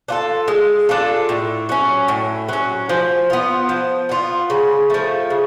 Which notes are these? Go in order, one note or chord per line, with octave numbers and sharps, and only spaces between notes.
D4 F4 A4
G#3
D4 F4 A4
A2
F#3 C#4
A2
F#3 C#4
F3
B3 F4
F3
B3 F4
C#3
F3 A3
C#3